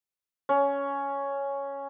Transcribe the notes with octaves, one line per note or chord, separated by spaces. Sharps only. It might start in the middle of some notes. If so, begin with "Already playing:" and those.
C#4